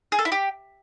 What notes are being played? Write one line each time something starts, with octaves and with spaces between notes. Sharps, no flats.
G#4
A4
E4
G4